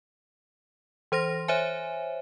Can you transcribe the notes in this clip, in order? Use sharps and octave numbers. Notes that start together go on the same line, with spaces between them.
E3 C5 C6 A#6
C5 C#5 E5 G#5